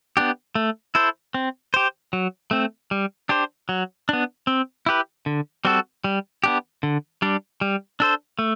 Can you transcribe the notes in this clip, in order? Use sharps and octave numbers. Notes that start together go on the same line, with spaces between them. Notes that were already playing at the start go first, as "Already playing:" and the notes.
B3 D4 G4
A3
E4 A4 C5
C4
G4 C5
F#3
A3 C4
G3
D4 G4 C5
F#3
B3 D4
C4
E4 G4 B4
D3
G3 C4 F#4 A4
G3
B3 D4 G4
D3
G3 D4
G3
D4 A4 C5
A3